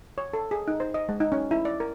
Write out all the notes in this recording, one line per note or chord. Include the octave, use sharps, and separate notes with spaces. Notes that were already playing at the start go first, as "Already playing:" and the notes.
C#5
A4
G#4
D#4
C5
D#5
G#3
D#4
C#4
E4
D5
A#4